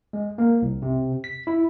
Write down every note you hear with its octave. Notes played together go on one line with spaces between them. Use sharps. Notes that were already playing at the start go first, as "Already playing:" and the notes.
G#3
A#3
C2
C3
B6
E4